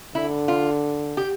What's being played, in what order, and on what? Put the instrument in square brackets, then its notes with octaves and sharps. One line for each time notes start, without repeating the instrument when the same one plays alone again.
[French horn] D3 [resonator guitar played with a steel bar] E4
[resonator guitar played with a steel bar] F4
G4